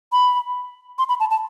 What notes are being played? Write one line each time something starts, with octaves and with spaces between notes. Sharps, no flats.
B5
C6
B5
A5
A5